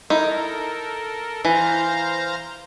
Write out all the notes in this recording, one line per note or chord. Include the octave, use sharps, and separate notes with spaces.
D#4 E4 A4 A#4
E3 C5 F5 A#5